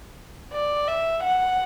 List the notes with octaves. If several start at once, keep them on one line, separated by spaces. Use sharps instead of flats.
D5
E5
F#5